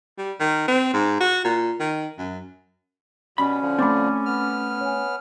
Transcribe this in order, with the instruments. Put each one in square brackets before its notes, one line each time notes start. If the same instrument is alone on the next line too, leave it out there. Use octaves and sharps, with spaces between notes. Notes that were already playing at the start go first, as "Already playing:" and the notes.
[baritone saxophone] G3
D#3
C4
G#2
F#4
A#2
D#3
F#2
[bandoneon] B2 G3 [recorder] C#4 [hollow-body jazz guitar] B5
[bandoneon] D3 F3
[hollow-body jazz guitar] A3 C4 [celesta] B5 D6 A6
[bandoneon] B3 F6
[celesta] C#5 G#5